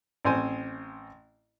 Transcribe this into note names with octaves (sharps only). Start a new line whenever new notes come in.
A1 C4 C5 G#5